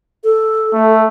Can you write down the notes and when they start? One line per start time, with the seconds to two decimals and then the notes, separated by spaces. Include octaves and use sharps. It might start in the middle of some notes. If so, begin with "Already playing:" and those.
0.24 A4
0.74 A3